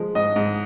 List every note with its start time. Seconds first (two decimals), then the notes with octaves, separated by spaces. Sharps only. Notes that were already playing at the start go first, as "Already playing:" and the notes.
Already playing: F3 G#3
0.15 G#2 D#5
0.36 G#2